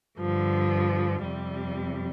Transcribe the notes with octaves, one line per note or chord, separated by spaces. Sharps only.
G2 D3 F3
F2 C3 G3